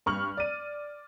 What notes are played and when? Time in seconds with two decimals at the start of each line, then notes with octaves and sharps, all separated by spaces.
0.06 G2 C#6 F6 F#7
0.37 D5 D#7